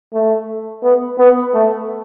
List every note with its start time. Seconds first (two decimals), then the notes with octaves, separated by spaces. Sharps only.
0.13 A3
0.83 B3
1.19 B3
1.54 A3